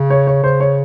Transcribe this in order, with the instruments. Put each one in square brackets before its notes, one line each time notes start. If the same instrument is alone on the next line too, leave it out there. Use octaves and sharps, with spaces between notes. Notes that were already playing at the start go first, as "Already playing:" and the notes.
Already playing: [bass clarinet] C#3
[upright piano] C#5
C#5
[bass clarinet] C#3 [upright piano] C5
[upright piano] C#5